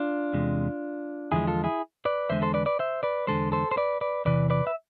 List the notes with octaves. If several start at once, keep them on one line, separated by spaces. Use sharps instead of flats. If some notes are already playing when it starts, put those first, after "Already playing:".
Already playing: D4 F4
E2 C3 G#3
E2 D3 F3 G#3 E4 G#4
F4 A4
E4 G#4
B4 D5
E2 D3 G#3 C5 E5
A4 C5
B4 D5
B4 D5
C5 E5
B4 D5
E2 D3 G#3 A4 C5
A4 C5
C5
B4 D5
B4 D5
E2 C3 E3 B4 D5
B4 D5
E5